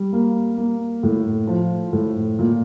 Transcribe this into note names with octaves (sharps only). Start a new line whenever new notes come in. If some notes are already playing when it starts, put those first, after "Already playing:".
Already playing: G3
A#3
A#3
A2
F3
A2
A#2